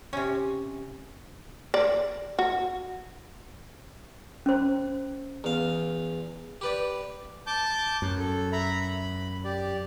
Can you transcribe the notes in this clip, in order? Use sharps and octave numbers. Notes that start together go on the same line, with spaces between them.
C3 C#4
D5
F#4
C#4 C5
E2 F5
G4 B4 D5
A5 D6 G6
F#2
A4
E5 A#5 B5
B5
G4 D5